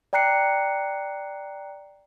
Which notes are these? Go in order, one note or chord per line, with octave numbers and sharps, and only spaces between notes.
D5 G5 A#5 F#6 C7 C#7